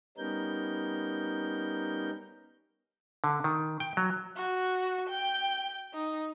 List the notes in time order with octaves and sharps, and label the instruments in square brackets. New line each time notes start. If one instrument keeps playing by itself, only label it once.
[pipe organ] G3 B3 C#4 D#4 A#4 G6
[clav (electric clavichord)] D3
D#3
G5
F#3
[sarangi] F#4
G5
D#4